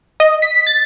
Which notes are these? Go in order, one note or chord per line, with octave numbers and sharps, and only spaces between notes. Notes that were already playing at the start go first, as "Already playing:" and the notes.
D#5
B6
A6